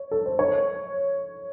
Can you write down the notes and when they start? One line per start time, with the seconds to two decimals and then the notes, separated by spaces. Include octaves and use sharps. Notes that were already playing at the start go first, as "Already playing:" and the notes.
Already playing: C#5
0.11 A4
0.26 C5
0.39 C#5